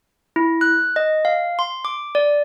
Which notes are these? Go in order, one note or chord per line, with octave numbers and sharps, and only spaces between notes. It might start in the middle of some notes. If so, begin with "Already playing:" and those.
E4
F#6
D#5
F5
C6
D6
D5